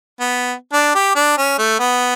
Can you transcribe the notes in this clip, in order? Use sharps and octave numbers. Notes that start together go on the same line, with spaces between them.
B3
D4
G4
D4
C#4
A3
B3